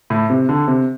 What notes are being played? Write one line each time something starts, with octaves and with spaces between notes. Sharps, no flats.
A2
C3
D3
C3